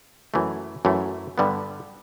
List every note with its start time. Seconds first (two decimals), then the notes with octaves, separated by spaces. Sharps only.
0.34 F#2 E3 A3
0.85 F#2 E3 A3
1.38 G2 D3 G3 B3